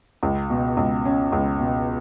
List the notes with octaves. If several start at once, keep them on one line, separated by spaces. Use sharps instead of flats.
C#2
B2
C#2
C#4
C#2
B2